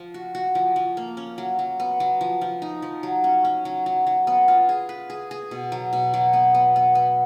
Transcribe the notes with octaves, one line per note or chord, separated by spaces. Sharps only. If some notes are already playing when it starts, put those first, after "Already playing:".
Already playing: F3
F#4
F#4
F3
F3
A#3
C#4
F#3
F#3
B3
F#3
F3
F3
D#4
F3
F#3
C#4
C#4
F#3
F#3
F#3
B3
F4
G#4
B4
G#4
G#4
B2
F#3
B2
F#3
B3
B3
B3
B3